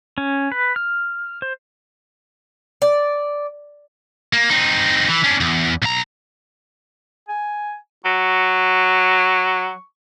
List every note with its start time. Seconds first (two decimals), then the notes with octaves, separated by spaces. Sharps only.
0.18 C#4
0.52 B4
0.76 F6
1.42 C5
2.82 D5
4.33 A#3
4.50 C4 D#4
5.09 E3
5.24 C#4 D4
5.41 E2
5.82 B1 A#5
7.29 G#5
8.05 F#3 C#6